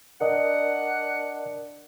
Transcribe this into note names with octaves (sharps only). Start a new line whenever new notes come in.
D4 A#4 D#5 F#5